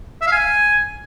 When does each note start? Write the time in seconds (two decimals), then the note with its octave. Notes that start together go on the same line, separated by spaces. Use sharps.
0.22 E5
0.27 F5
0.32 G#5